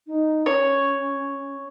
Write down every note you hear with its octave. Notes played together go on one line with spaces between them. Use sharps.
D#4
C#4 C#5